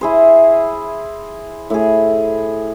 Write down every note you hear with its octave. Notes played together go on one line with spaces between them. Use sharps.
E4 G#4 C5
A2 G#4